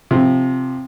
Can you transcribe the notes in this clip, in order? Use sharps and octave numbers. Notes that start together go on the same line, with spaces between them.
C3 F3